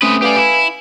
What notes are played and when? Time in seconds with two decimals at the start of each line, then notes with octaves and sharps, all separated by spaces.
0.02 A3 C4 C#4 B4 D#6
0.22 G4 B4 D5 F5 G#5
0.38 E4